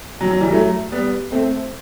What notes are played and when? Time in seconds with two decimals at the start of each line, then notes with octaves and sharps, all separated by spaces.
0.21 F#3
0.31 F#3
0.41 E3 G3
0.51 F#3 A3
0.92 G3 B3
1.32 A3 C4